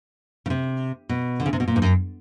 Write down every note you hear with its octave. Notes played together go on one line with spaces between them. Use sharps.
C#3
C3
B2
D3
C#3
C3
B2
A#2
G2
F#2